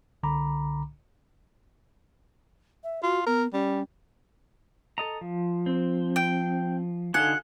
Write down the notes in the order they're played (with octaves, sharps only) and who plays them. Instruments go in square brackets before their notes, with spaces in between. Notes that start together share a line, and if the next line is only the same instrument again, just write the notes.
[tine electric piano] C2 D3 A#5 B5 D6
[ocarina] E5
[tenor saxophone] F4 [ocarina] F#4
[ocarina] B3 [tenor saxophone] A#4
[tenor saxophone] G3 [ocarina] C#4
[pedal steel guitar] A4 D#5 A#5
F3
[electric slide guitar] C4
[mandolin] G5
[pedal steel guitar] D3 D#4 F#4 [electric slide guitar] A4 F5 G#5 [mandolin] F#5